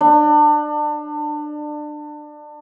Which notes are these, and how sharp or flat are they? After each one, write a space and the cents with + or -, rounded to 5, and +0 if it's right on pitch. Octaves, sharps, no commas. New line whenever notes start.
D4 +30